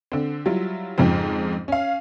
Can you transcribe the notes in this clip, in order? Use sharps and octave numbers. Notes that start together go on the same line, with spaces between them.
D3 C4
F#3 G3 E4 F4
F2 G#2 C#3 F3 C4
C#4 F5